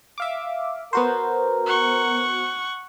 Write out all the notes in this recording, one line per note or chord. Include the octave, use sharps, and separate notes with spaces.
E5 F5 D6
B3 F#4 A#4 C5
F#5 C#6